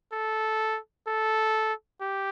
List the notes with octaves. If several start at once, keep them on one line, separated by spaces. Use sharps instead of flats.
A4
A4
G4